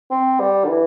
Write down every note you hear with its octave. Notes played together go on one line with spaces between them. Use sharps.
C4
G3
D3
E3